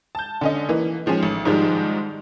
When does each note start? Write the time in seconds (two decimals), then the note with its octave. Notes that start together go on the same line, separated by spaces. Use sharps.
0.15 A5 G6
0.41 D3 C#4 D#5
0.69 E3 A#3
1.06 D#3 F3 G#3 C#4
1.23 A1
1.45 G#2 D#3 F3 G3 G#3